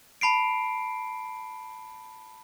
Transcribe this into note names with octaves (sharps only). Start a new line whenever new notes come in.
A5 B5 C7 D7